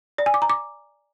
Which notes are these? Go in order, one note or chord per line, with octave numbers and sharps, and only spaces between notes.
D5
G#5
D6
A#5
D6